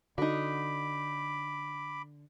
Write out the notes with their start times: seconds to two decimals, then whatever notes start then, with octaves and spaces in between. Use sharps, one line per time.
0.18 D3 D#4 F#4 B5 D6